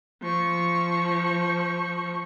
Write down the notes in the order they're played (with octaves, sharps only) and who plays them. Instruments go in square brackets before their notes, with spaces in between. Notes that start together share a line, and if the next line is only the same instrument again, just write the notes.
[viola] F3 C#6